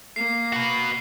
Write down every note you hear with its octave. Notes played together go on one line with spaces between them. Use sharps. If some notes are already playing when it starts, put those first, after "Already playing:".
A#3 C7
F#4 B4